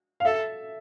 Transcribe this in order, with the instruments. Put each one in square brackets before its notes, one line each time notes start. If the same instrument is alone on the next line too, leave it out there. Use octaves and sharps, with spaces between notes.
[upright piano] F5
[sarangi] A4 [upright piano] E5